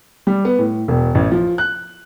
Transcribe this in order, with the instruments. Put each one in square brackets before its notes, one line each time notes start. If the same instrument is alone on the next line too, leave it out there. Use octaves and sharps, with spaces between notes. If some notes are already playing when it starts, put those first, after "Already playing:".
[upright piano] G3
B3
A2
E1
A1
F3
F#6